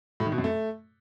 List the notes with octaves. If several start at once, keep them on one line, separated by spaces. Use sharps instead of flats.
A2
D#3
B2
F#2
A3